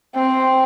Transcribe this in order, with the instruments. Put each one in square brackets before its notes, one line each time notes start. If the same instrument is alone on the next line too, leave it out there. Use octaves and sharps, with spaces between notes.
[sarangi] C4